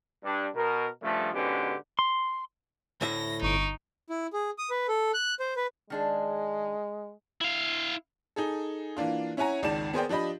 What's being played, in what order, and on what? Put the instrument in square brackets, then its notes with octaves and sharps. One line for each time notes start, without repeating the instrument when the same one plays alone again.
[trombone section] G2 D4
B2 A#4
G2 C#3 F3 A3
G#2 B2 D3 C#4 G4 B4
[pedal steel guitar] C6
[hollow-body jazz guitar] D2 A2 E5 [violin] A#6
[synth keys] G1 C#6 D7 [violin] D#4
[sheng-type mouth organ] E4
G#4
D#6
B4
A4
F#6
C5
B4
[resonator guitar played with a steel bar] D#3 D4 G#4 [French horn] G#3
[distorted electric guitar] E4 F5
[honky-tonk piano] D#4 G#4 A4
E3 A#3 D4 F4
C#4 E4 C#5 F#5 G#5 A#5
G#1 C#2 D#3 D5 A5 E7
B3 G#4 A#4 C5 D5 G5
F3 D4 G4 D#5 B5